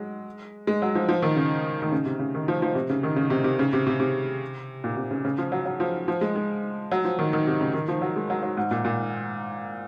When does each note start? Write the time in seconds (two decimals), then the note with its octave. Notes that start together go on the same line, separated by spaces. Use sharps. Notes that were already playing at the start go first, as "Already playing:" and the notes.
Already playing: F#3 G#3
0.67 G#3
0.82 F#3
0.95 F3
1.09 F3
1.22 D#3
1.36 C#3
1.82 D#3
1.92 C#3
2.06 C3
2.19 C#3
2.34 D#3
2.48 F3
2.62 F3
2.75 C3
2.90 C#3
3.03 D#3
3.16 C#3
3.30 C3
3.44 C3
3.59 C#3
3.73 C3
3.87 C3
4.00 C3
4.84 A#2
4.97 C3
5.11 C#3
5.25 C#3
5.38 F3
5.52 F#3
5.66 F#3
5.80 F3
6.08 F3
6.21 G#3
6.35 G#3
6.92 F#3
7.05 F3
7.19 D#3
7.33 D#3
7.47 C3
7.60 C#3
7.73 D#3
7.88 F3
8.02 F#3
8.16 G#3
8.30 F#3
8.43 F#3
8.57 G#2
8.71 A#2
8.84 A#2